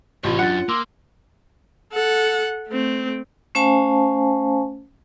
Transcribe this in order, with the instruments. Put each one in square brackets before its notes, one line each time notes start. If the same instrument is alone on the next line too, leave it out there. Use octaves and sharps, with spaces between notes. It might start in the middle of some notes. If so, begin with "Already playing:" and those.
[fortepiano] A1 [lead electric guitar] C3 C#5 [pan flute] F4
[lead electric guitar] F#2 [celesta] D4 A6 [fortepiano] F#5
[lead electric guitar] A#3 [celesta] C6 D6 E6
[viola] A4 F#5
A3 C4
[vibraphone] A3 C#4 C5 F5 G#5 A5